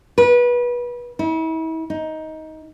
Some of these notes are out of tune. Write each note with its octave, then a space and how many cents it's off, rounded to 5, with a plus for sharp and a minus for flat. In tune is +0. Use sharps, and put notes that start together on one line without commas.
B4 -25
E4 -40
D#4 +15